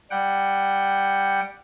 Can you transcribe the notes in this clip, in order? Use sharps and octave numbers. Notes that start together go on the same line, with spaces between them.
G3 F#5 G5